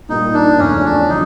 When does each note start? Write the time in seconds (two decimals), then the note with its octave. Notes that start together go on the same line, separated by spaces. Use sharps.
0.09 A#2 G3 A#3 D#4
0.34 D4
0.58 E2 C#3 F3 A3 C#4
0.84 D4
1.09 D3 F#3 D#4